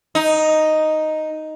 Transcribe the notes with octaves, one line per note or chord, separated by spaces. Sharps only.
D#4